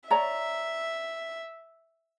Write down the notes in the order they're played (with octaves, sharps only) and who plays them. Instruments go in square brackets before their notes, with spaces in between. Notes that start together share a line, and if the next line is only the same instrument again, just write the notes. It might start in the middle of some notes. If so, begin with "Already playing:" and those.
[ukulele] C#5 D5 A#5 [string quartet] E5